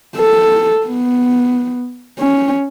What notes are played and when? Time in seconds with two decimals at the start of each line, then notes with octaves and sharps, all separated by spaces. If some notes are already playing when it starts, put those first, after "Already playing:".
0.17 A4
0.87 B3
2.19 C#4